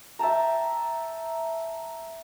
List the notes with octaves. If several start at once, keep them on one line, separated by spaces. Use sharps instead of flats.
E5 G5 A5 A#5